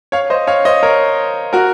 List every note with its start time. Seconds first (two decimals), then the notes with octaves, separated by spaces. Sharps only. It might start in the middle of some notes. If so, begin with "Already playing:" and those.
0.12 C#5 F5
0.30 C5 D#5
0.47 C#5 F5
0.65 C5 D#5
0.83 A#4 C#5
1.53 F#4 A#4